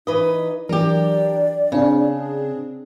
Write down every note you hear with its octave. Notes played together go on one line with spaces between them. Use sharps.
E3 D#4 B4 D#5
E3 F#3 D4 G4 A#4 D5
C#3 C4 D4 G#4